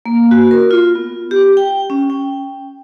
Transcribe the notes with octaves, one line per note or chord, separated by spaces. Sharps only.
A#3
F#4
A#4
F4
B3
G4
G5
C#4
G5